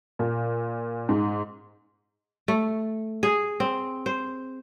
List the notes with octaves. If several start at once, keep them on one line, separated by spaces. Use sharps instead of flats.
A#2
G#2
A3
G#4
C4
C5